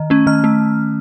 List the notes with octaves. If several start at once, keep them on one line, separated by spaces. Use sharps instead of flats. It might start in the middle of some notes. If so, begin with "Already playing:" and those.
Already playing: D#3
A3 C#4
D#3 F6
A3